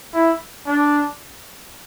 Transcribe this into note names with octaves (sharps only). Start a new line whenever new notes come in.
E4
D4